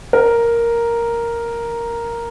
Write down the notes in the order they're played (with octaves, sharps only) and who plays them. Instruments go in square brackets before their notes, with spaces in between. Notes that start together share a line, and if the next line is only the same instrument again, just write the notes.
[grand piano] A#4